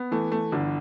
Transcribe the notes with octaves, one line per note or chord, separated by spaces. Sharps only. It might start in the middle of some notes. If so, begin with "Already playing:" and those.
Already playing: B3
E3 A3
A3
G1 D3